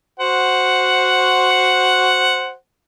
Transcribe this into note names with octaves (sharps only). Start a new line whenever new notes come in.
F#4 C5 F#5